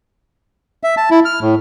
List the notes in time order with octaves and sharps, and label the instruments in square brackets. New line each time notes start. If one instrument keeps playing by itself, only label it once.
[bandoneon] E5
A5
E4
F6
A2